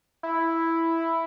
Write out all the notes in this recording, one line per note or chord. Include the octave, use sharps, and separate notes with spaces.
E4